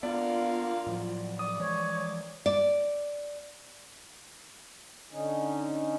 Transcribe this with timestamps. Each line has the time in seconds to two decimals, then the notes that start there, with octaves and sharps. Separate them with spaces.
0.03 D3 B3 F4 A#4 D5 F5
0.87 A2 F3 F#3
1.39 D5 D#6
1.60 E3 F3 G#3 C#5
2.46 D5
5.11 D3 C#4 D#4